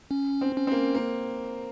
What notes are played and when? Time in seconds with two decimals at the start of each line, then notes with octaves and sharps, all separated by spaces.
0.11 C#4
0.41 C4
0.57 C#4
0.67 C4
0.72 A#3
0.95 A#3